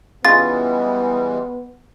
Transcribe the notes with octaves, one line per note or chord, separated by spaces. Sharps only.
C#3 E3 G3 G#3 B3 F4 A6